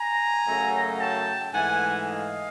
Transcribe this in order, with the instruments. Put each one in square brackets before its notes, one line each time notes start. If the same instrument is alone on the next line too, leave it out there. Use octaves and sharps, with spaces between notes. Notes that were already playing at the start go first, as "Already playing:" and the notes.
Already playing: [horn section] G#5 A#5
F#2 C#3 F#3 A3
G5 A5
G#2 E3 A3 F#5 G#5
D#5 F5